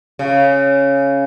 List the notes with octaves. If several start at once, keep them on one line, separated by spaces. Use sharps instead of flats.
C#3